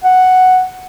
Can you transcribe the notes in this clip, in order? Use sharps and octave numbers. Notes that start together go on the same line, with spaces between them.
F#5